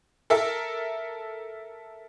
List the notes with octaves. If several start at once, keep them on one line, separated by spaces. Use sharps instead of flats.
A4 A#4 E5